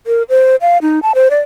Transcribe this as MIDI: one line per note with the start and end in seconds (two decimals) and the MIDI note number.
0.07 0.23 70
0.29 0.56 72
0.61 0.78 77
0.82 1.00 63
1.03 1.12 81
1.15 1.28 72
1.30 1.40 74